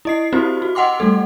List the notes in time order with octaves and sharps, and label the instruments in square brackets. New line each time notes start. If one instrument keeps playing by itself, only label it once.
[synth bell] E4 D#5 C7
C4 E4 F#4 G4 C5
F#4
D#5 F#5 G5 C6 D6
G3 A3 A4